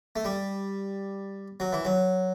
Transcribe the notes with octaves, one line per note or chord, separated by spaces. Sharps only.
A3
G3
F#3
E3
F#3